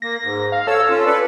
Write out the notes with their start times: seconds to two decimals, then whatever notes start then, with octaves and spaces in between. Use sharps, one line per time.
0.02 A#3 A#6
0.23 G#2
0.52 F5
0.67 A4 C#5 E6
0.90 C#4 F4
1.06 A4 B4 D5